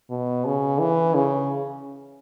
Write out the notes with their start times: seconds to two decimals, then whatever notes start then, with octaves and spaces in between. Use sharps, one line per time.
0.10 B2
0.45 C#3
0.80 E3
1.15 C#3